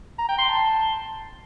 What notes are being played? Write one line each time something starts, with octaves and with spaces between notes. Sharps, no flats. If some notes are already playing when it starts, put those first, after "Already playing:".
A#5
G5
C6
A5